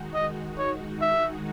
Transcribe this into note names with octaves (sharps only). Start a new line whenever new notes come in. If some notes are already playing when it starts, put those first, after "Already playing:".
Already playing: D#3 G#3 D#4 F#4
D#5
C#5
D#3 G#3 D#4 F#4 E5